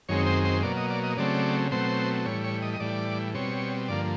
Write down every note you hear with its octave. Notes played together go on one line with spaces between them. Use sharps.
F#2 D#3 G#3 C4 C#5
C5
C5
B2 F#3 A#3 D5
D#5
D5
D#5
C#3 F#3 A3 C4 D5
B2 F#3 A3 C4 C5
A2 E3 G3 C#5
C#5
D#5
D#5
A2 E3 G3 D5
B2 G3 C4 C#5
G2 D3 F3 A#3 D5